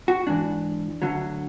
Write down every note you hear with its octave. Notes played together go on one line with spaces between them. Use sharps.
F#4
G#2 E3 D4
D2 D3 F#3